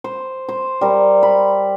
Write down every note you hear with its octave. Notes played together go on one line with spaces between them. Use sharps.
C5
C5
G3 A#4
B5